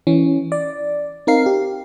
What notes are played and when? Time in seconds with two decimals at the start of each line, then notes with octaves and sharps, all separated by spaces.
0.07 E3 C#4
0.52 D5
1.27 C4 D#4 A#4 F5 C7
1.46 G4